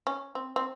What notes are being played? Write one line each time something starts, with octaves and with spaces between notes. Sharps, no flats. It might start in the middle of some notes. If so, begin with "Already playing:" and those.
C#4
C4
C4